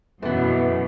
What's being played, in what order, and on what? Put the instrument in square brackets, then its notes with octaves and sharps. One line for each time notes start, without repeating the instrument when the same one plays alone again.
[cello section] F#2 B2 [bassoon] E3 [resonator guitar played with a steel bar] A3 B3